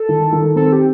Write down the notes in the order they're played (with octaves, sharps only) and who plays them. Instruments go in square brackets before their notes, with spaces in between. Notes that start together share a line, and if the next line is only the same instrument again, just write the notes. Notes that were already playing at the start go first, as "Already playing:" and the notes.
Already playing: [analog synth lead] A4
[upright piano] D#3
D#3
[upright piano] C4 [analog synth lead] A4
[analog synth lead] G4